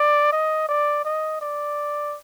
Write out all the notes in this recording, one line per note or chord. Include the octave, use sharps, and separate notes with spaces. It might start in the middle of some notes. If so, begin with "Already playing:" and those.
Already playing: D5
D#5
D5
D#5
D5